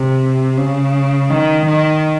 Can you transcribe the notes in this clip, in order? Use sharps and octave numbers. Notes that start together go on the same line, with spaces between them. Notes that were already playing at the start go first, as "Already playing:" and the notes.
Already playing: C3
C#3
D#3
D#3